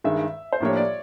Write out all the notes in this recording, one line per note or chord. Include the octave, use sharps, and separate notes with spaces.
G2 D#3 G#3 E5
C5
A2 F3 A#3 D4 G4 C#5
D5